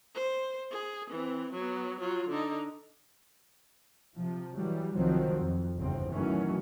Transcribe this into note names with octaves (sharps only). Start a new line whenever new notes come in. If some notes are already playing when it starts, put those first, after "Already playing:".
C5
G#4
E3 C4
F#3 B3
F#3 F4
D3 D#4
C3 F3
E3 F#3 G3
C2 D#3 F3 F#3 C4
F2
G1 E2 C#3 C4
D#3 E3 F#3 A3 C#4